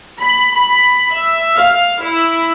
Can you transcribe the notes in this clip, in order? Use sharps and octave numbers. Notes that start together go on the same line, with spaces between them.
B5
B5
E5
F5
E4